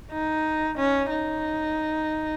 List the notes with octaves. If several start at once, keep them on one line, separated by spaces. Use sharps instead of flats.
D#4
C#4
D#4